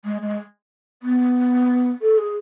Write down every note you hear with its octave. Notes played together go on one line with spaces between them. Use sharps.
G#3
G#3
B3
A4
G#4